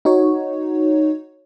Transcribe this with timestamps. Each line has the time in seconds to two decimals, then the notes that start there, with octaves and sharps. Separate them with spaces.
0.05 D#4 F#4 C#5